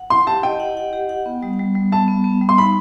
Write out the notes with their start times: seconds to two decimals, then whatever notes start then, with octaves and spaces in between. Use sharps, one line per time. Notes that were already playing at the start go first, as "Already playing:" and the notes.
Already playing: F#5
0.10 E4 C6
0.27 G4 A5
0.43 D#5 G5
0.60 F#5
0.77 F#5
0.93 G4
1.09 F#5
1.26 B3
1.43 G3
1.59 G3
1.75 G3
1.92 B3 A5
2.08 B3
2.24 B3
2.41 G3
2.49 C6
2.57 D#4 B5